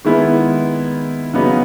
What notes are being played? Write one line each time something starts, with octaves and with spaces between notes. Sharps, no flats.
D#3 G#3 B3 E4
C#3 F#3 B3 D#4